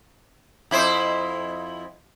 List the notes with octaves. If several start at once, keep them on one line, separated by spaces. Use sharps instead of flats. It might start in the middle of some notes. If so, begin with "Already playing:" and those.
F2 E4 C5